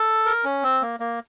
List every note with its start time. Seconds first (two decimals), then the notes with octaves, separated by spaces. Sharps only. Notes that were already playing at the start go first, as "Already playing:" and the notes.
Already playing: A4
0.25 A#4
0.44 C#4
0.63 C4
0.82 A#3
1.00 A#3